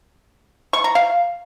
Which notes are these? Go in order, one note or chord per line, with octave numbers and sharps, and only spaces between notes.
C#6
A#5
F5